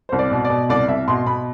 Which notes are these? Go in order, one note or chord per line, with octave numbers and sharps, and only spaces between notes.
C2 C5
D5
B2
D5
B2
C2 D5
C2 E5
B2 C6
B2 B5